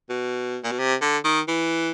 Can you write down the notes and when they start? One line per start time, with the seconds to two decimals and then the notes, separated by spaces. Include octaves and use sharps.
0.09 B2
0.64 A#2
0.71 B2
0.79 C3
1.01 D3
1.24 D#3
1.48 E3